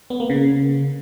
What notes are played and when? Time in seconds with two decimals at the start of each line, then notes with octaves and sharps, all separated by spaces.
0.10 B3
0.20 A#3
0.30 C#3